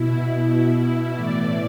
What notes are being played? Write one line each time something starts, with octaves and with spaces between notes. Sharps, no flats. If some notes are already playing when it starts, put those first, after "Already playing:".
Already playing: B2 E4
B2 E4
A2 E3 D5